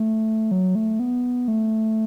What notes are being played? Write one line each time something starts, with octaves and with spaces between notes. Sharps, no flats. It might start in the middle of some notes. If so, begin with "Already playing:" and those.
Already playing: A3
F#3
A3
B3
A3